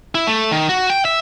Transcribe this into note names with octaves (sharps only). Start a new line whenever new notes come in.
E4
A3
D#3
F#4
G5
E5